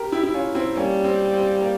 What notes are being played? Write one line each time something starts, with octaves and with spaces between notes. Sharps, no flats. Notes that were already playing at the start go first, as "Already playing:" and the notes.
Already playing: G4 A#4
E4 G4
E4
C#4 F4
C4 E4
G3 A#3 C#4
C4
C4
A#3